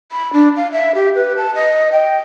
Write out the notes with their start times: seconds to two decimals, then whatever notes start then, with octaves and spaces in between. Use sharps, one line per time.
0.12 B5
0.33 D4
0.57 F5
0.72 E5
0.95 G4
1.15 B4
1.37 A5
1.55 D#5
1.92 G5